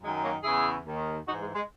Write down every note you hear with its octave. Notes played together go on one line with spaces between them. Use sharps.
F#2 D#3 G#3
F#3 A#3
E2 C#3 E3 E4 G#4
D#2 D#3
G#2 E3 D#4 F#4
G#3
G#3